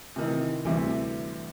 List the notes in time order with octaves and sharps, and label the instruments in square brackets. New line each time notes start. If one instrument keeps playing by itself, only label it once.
[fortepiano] C3 D#3 E3
[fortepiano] D2 C3 [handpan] E3 G3 E5